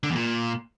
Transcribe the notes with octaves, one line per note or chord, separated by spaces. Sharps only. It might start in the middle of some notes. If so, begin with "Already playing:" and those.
D3
E2
A#2